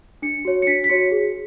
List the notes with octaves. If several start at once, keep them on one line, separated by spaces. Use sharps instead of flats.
D4 C#7
F#4 C#5
C#7
D4 B6
B6
F#4 C#5 C#7
G#4